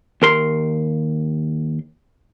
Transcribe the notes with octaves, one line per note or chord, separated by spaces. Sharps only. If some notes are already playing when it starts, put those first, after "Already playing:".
D#2 A#4 C6